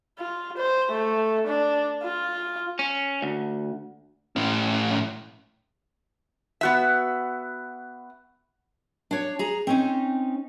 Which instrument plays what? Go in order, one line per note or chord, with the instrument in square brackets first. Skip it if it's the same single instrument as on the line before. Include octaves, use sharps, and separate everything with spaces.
[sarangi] F4
C5
A3
D4
F4
[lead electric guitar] C#4
D2
A2 C#4
[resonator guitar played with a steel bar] B3 F#4 E5
[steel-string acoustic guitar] D4 C#5
G#4 A#5
C4 C#4 D#4